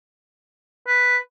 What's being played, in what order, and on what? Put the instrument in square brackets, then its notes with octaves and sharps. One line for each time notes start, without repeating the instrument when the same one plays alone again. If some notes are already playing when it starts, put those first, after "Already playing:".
[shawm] B4